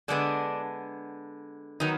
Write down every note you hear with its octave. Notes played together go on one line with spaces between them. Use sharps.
D3 G#3 B3 D4
D#3 F#3 B3 D#4